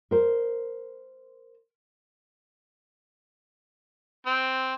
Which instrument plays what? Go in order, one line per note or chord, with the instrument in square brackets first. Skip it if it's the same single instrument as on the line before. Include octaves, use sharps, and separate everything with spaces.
[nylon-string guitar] A#4 C5
[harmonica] C4